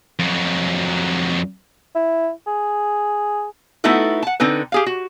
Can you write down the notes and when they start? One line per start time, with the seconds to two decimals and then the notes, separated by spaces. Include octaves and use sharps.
0.19 F2 F#3
1.95 E4
2.47 G#4
3.84 A3 B3 D#4 E4 F#4 A4
4.22 F#5 A5
4.40 D3 C4 D#4 B4
4.72 G4 G#4 F5
4.86 F#4